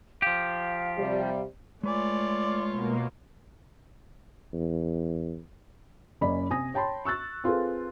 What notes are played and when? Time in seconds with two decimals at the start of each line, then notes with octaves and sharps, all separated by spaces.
0.22 F3 G4 F5
0.98 C3 G3
1.83 G#3 A3 F4 B4 C#5 D5 G#5
2.69 B2 A#3
4.53 E2
6.21 F#1 C#4 D5 D#5 B5
6.50 C3 G#5 D#6 A#6
6.74 C#5 G5 A5 B5 C6
7.05 C#6 E6 F#6 A6
7.44 C4 F4 G#4 A4 B4